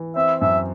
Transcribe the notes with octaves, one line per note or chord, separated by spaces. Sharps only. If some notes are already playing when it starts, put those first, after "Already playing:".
Already playing: E3
C4 E5
F#2 E5